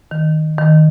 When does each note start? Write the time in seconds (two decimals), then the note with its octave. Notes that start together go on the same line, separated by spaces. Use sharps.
0.11 D#3
0.58 D#3